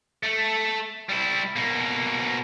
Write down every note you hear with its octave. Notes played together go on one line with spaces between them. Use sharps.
A3
G3 E4
B2 A#3